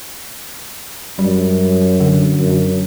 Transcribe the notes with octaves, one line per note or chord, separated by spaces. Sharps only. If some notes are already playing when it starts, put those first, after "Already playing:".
F#2 G3
D3
F#2